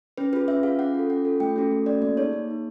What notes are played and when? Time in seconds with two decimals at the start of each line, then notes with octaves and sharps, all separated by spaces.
0.18 C#4 B4
0.33 F4 G#4 B4
0.48 C#4 E5
0.63 F4 G#4 F5
0.79 C#4 F#5
0.94 F4 A4
1.10 C#4 F#5
1.25 F4 A4
1.40 A3 G5
1.56 C#4 F#4 A4
1.71 A3
1.86 C#4 F#4 A4 D5
2.02 A#3 D5
2.17 D#4 G#4 C#5
2.33 A#3
2.48 D#4 G#4